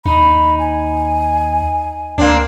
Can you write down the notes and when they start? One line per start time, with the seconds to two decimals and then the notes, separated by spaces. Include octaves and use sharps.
0.06 D#2 D#4 B5
0.59 G#5
2.18 D2 A#3 C4 D4